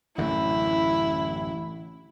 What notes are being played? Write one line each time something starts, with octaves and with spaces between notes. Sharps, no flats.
A1 F#2 D3 E4